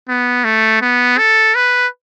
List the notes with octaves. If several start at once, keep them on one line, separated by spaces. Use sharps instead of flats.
B3
A3
B3
A4
B4